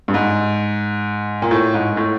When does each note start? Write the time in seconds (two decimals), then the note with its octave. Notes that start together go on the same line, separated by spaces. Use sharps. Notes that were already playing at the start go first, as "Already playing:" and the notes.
0.08 G2
0.14 G#2
1.42 A#2
1.51 A2
1.74 G#2
1.97 A2